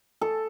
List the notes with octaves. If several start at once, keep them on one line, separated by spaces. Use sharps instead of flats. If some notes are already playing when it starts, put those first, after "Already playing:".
A4